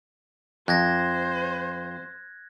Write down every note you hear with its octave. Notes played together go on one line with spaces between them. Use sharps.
F2 C5 F#6 G#6 A#6